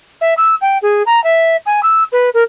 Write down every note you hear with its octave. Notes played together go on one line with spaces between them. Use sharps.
E5
E6
G5
G#4
A#5
E5
G#5
E6
B4
A#4